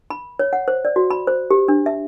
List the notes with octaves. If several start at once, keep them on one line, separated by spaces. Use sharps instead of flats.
B5
C#5
F#5
C5
D5
F#4
B5
C5
G4
D4
E5